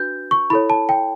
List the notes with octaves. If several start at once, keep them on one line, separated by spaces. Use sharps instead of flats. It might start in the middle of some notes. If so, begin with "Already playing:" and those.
Already playing: D4 F#4 B4 G6
C#6
E4 A4 C#5 B5
A5
G5